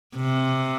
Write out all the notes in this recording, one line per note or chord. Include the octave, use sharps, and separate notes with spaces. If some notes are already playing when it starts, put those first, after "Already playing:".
C3